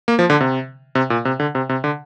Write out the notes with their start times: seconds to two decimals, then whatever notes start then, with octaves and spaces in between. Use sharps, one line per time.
0.08 A#3
0.19 F3
0.30 D3
0.40 C3
0.95 C3
1.10 A#2
1.25 C3
1.40 D3
1.55 C3
1.69 C3
1.84 D3